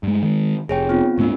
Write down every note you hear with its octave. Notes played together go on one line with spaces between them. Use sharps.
G2 G#3
D#3 G#3
F1 G#4 C#5 G5
B3 C4 F4
D2 G#2 A#3 C4 D4